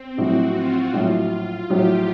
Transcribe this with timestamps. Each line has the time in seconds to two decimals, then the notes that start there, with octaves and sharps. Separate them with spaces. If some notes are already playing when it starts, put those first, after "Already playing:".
Already playing: C4
0.17 A#1 A2 F#3 F#4
0.55 F4
0.94 A#1 A2 F#3 F4
1.31 F4
1.70 A#1 A2 F#3 G4